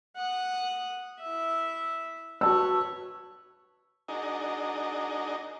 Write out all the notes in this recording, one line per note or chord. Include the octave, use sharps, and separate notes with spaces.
F#5 D#6
E4 E5
F#4 B4 C#5 A5 E6
D4 D#4 F#4 G#4 A#4 D#5